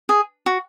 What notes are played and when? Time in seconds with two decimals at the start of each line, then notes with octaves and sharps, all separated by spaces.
0.09 G#4
0.46 F#4